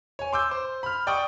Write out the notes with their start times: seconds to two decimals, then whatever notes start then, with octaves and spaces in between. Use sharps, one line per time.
0.19 C#5 G#5
0.33 C6 D6 E6 G6
0.51 C5
0.83 B5 F6
1.07 D5 G5 C#6 D#6